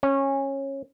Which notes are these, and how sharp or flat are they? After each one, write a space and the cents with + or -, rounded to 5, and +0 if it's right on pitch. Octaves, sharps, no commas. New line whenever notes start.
C#4 -20